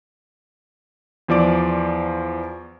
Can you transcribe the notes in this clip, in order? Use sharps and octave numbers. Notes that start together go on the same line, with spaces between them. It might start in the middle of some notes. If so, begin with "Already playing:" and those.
E2 F3 D5 D6